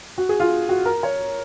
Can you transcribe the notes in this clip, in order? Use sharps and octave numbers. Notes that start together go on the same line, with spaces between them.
F#4
G#4
F4
F#4
A#4
C#5